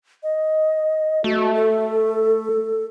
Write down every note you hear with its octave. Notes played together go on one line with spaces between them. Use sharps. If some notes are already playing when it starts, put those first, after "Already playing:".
D#5
A3 F#4
A4